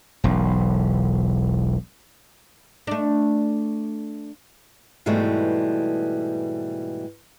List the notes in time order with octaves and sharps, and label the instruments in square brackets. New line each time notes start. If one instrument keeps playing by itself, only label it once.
[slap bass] E1 B1
[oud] A3 D4
[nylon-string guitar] G#2 B2 E3 G3 A3